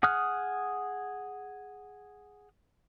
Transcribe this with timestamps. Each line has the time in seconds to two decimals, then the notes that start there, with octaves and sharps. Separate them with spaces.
0.03 G#4 F#5 D#6 F6 F#6